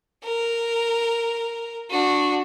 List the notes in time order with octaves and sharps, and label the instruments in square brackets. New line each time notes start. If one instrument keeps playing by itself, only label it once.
[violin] A#4
D4 F#4